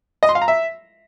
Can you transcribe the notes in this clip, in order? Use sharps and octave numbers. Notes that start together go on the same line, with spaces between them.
D#5
C6
F5
A#5
E5